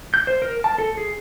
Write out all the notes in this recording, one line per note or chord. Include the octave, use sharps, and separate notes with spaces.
G6
C5
A#4
A5
A4
G#4